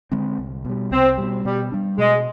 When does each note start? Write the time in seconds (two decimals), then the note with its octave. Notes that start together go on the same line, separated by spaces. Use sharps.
0.12 D3 G#3 C4
0.38 C2
0.65 B2 G3
0.91 C2 C4
1.18 B2 G3
1.45 B2 G3
1.72 G3 D4
1.98 B2 G#3